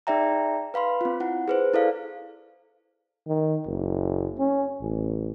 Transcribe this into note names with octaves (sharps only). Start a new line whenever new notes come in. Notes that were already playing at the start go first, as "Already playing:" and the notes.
D#4 G#4 D5 E5 G5 A#5
B4 F5 B5 C6
C4 F4
E4 F#5
G#4 B4 C5
E4 A4 D5 F5
D#3
F#1
C#4
A1